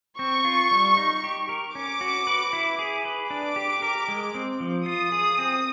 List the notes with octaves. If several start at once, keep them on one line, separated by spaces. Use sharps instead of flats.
C4 C#6
F4
G3
D#4
G4
A#4
C#4 D6
F#4
B4
E4
G#4
B4
D4 D6
G4
A#4
G#3
C4
F3
F4 D#6
G#4
C4